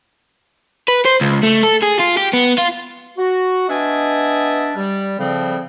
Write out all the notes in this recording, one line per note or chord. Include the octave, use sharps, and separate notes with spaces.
B4
C5
C#2
A3
A4
G#4
F4
G4
B3
F4
F#4
B3 D4 D#5 E5 G#5
G3
A2 C#3 F3 G3 C4